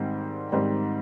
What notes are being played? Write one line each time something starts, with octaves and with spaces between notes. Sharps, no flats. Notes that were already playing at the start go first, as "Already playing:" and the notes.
Already playing: G#2 D#3 G3 C4
G#2 D#3 G3 C4